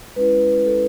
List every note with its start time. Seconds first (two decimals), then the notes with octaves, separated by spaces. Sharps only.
0.16 G#3 C#4 E4 B4
0.66 A4